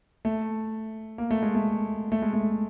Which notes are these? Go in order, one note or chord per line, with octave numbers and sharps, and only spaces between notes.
A3
A#3
A3
G#3
A3
A3
G#3
A3